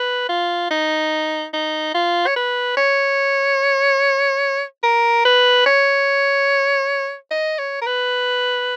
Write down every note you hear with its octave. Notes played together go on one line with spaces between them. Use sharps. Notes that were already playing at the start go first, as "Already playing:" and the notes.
Already playing: B4
F4
D#4
D#4
F4
C#5
B4
C#5
A#4
B4
C#5
D#5
C#5
A#4
B4